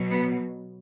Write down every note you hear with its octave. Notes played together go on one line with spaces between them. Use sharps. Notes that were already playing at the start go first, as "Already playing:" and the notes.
Already playing: B2 F#3
B3